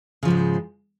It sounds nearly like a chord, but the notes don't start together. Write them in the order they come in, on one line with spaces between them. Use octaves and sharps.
C#3 F3 G#2 G#3